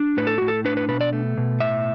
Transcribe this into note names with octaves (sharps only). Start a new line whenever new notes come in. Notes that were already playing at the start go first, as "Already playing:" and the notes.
Already playing: D4
A2 B4
A4
A2 F#4
A4
D4 B4
B4
B2 B4
D5
A3
B2
A2 E5